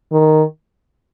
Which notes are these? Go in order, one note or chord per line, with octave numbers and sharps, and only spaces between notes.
D#3